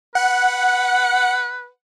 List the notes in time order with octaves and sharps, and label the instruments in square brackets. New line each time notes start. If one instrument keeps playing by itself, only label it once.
[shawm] B4 [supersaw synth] F#5